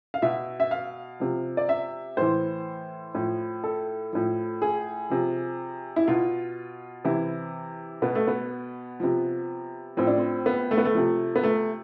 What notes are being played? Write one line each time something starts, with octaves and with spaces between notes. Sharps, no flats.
F5
B2 E5
E5
F5
C3 F3
D5
E5
A2 E3 C5
A2 F3
A4
A2 F3
G#4
C3 F3
E4
B2 F4
C3 E3 E4
B2 B3
A3
B3
C3 F3
A2 F3 C4
D4
C4
B3
A3
B3
A3
C3 F3
B3
A3